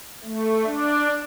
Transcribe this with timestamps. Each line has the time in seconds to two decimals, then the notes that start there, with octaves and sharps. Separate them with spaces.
0.24 A3
0.65 D4